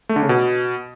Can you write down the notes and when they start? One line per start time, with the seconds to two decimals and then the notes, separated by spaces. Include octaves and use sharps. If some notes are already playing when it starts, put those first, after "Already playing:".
0.09 A3
0.16 D3
0.23 C#3
0.29 B2